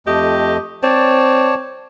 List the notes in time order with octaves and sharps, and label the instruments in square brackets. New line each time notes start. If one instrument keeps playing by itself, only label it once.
[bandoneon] F2 A3 D#5 [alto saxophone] G4
[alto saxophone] C4 [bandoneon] C#5 D5 A5